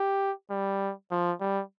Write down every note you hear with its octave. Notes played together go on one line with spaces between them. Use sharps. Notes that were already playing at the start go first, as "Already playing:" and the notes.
Already playing: G4
G3
F3
G3